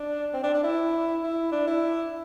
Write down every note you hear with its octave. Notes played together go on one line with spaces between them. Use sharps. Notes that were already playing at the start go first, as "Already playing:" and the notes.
Already playing: D4
C4
D4
D4
E4
E4
D4
E4